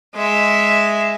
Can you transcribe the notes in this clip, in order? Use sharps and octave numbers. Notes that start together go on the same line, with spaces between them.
G#3 E5